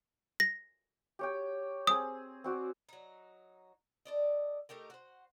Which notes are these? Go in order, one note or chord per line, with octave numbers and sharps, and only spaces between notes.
A#6
G4 C#5 G5
C4 G#4 D#6
C4 F#4 D5
F#3 D#4
A4 D5 D#5
A3 D#4 G4 A#4
F#4 C5